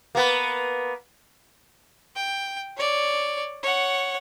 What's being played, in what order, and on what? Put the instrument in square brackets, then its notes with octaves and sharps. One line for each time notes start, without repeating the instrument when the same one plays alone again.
[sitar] A#3 B3
[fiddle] G5
C#5 D5
C#5 F#5